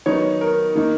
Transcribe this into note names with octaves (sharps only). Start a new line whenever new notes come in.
D#3 F#3 B3 D#4 C#5
A#4
D#3 A#3 D#4